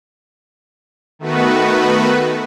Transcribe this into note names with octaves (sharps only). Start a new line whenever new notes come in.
D#3 A3 B3 F#4 B4